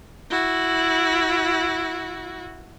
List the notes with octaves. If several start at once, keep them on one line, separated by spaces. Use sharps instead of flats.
E4 F#4